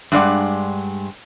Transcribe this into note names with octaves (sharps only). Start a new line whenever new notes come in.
G2 G#3 D5 F#5